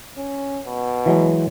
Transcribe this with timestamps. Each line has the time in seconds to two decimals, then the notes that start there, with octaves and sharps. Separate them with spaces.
0.17 C#4
0.65 B2
1.06 E3 F#3 G#3